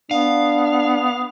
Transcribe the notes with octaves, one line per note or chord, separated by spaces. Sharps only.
B3 D4 F5